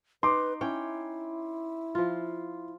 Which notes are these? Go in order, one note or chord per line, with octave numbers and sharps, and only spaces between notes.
D#4 B4 C6 D6
C#4 E4 C#5 G5
F3 F4